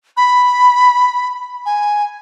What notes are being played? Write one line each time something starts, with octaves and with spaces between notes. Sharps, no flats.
B5
G#5